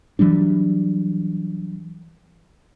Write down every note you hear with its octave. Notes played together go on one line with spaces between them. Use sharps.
E3 F#3 G3 D4